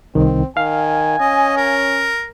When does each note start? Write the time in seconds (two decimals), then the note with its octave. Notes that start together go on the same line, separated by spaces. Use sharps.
0.15 C2 D#3 C4
0.57 D#3 F5 G#5
1.20 C#4 D#5
1.57 A#4